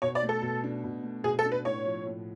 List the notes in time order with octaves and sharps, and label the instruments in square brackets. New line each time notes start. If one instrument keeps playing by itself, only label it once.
[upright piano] B2 [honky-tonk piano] C#5
[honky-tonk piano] D5
[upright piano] A3
[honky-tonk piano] A4
[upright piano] B2
D4
B2
A3
[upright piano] B2 [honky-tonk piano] G#4
[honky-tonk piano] A4
[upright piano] D4
[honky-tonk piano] B4
[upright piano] A2 [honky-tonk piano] C#5
[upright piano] F3
A2